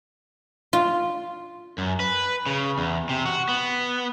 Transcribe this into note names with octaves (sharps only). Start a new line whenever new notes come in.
F4
F#2
B4
C#3
E2
C3
F#4
B3